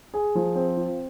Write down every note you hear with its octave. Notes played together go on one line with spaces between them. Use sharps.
G#4
F3
C4
F4